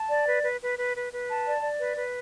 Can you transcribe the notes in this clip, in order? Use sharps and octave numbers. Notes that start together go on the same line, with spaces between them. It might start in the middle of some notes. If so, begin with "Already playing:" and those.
Already playing: A5
D5
B4
B4
B4
B4
B4
B4
A5
D5
D5
B4
B4